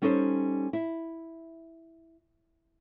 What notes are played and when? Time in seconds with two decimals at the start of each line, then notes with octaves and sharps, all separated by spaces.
0.02 G3 C#4 D#4 A4 B4 C5
0.73 E4